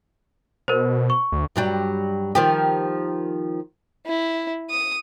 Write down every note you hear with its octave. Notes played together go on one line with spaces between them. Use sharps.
B2 A#4 C5
C#6
D2
G2 F#3 G3
D#3 F3 G4
E4
D#6